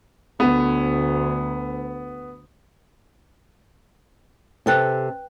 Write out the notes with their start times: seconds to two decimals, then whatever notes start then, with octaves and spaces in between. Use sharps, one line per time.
0.40 D2 B3
4.66 C3 A4 B4 G5 F#6